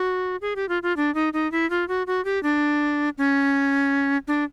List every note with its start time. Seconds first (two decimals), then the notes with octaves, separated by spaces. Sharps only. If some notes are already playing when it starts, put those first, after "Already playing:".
Already playing: F#4
0.41 G#4
0.56 G4
0.69 F4
0.83 F4
0.97 D4
1.15 D#4
1.33 D#4
1.52 E4
1.70 F4
1.88 F#4
2.07 F#4
2.25 G4
2.43 D4
3.18 C#4
4.28 D4